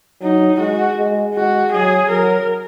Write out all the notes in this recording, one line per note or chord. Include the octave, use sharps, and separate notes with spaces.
F#3 D#4
G#3 F#4
G#3
G#3 F#4
F#3 G#4
F#3 A#4